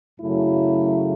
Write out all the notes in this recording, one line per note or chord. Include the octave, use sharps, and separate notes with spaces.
F#2 C#3 F#3 A3 E4